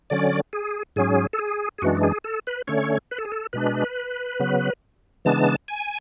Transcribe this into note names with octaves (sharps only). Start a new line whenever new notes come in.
D3 F#3 C#4 D5
G#4
G#2 F#3 C#4 G#4
A4
G#4
G#4
F#2 E3 G#3 D4 F#4
G#4
A4
B4
D3 A3 C#4 C#5
B4
A4
G#4
A4
B2 G#3 D4 B4
C#3 F#3 B3
C#3 E3 G#3 B3 D4 A5
G#5